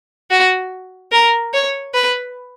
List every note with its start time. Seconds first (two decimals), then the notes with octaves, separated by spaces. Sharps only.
0.31 F#4
1.12 A#4
1.53 C#5
1.94 B4